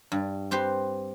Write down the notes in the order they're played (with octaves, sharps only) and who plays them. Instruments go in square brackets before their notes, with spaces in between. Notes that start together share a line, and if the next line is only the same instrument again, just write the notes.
[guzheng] G2
C4 G4 B4 C5